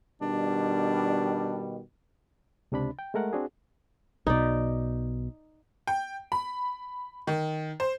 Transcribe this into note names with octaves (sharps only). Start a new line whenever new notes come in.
B2 D#3 G3 D4
C#2 C3 D4 B5
G5
G#3 A3 A#4 F#5
C4 D4 F#4 G#4
B1 B2 D#4 D5
G5
B5
D#3
C5